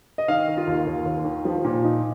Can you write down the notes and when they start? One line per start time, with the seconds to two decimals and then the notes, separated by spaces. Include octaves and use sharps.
0.18 D#5
0.28 D#3 F5
0.48 D#3
0.57 F4
0.67 D#2
0.87 D#2
1.05 D#2
1.25 D#3
1.45 F3
1.65 A#2
1.84 D#4